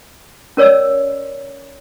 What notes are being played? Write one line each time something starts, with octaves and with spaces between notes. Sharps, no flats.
C#4 A#4 C#5 D5 E6